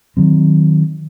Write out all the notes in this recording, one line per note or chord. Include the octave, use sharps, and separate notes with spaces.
D#3 F#3 C4